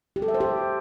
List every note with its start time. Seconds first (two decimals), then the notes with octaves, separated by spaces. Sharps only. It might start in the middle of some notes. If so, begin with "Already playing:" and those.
0.16 G4
0.22 A4
0.28 E5
0.34 C5
0.41 G4